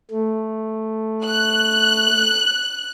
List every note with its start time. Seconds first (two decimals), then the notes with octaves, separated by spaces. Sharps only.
0.11 A3
1.24 F#6